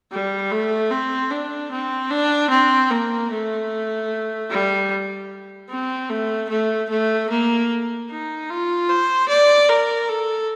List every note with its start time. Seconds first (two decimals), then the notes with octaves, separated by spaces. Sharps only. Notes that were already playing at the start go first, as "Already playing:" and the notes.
0.11 G3
0.52 A3
0.91 C4
1.31 D4
1.71 C4
2.11 D4
2.50 C4
2.90 A#3
3.31 A3
4.50 G3
5.70 C4
6.10 A3
6.50 A3
6.90 A3
7.30 A#3
8.10 D#4
8.50 F4
8.89 C5
9.29 D5
9.69 A#4
10.09 A4